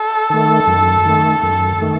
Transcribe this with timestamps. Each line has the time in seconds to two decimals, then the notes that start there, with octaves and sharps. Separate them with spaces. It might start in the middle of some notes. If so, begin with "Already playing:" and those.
Already playing: A4
0.30 D#3 A3
0.67 F#2
1.06 D#3 A3
1.43 F#2
1.81 D#3 A3